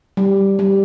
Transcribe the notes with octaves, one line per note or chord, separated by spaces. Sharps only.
G3
G3